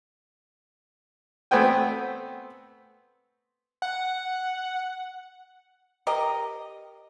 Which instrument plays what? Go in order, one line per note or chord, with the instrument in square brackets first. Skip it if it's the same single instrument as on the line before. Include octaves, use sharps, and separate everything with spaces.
[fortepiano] A3 B3 C4 G5 G#5
[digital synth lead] F#5
[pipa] G4 A#4 D#5